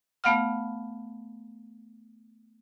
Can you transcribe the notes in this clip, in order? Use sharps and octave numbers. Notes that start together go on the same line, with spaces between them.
A3 B3 F5 F#5 F6